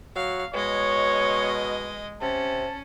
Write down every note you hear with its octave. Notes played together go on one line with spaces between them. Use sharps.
F#3 F5
B2 G#3 C#5 D#5
C3 C#4 A5